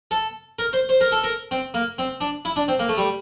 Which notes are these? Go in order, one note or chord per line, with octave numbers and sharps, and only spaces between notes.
A4
A#4
C5
C5
A#4
A4
A#4
C4
A#3
C4
D4
E4
D4
C4
A#3
A3
G3